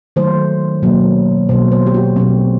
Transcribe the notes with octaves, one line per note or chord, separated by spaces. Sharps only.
D#3 F#3 A3 C5
B2 F#3 A#3
B2 F#3 A#3 C5
C5
G4
F#4
B2 F#3 A3 C4